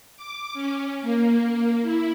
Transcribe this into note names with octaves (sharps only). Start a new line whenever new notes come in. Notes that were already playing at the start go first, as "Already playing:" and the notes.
D6
C#4
A#3
E4